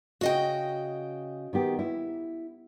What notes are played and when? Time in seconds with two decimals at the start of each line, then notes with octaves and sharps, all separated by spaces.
0.21 C#3 F#4 D#5 G5
1.53 D#3 B3 G4
1.79 E4